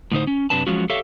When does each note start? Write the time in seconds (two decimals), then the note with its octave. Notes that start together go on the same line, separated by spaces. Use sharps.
0.12 A2 D3 D#4 C5
0.27 C#4
0.50 F#2 C3 D4 B4 A5
0.67 F3 F#3 G#3 C#4 F4 F#4
0.90 G4 A4 C#5 E5 F5